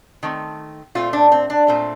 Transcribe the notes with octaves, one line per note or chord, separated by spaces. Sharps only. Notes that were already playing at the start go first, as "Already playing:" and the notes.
D#3 A3 C4
A#2 A3 C4 F4
D4
C4
D4
A#2 A3 C4